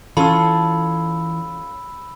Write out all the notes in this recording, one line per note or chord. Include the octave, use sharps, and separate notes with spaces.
E3 C#4 F4 A4 B5 E6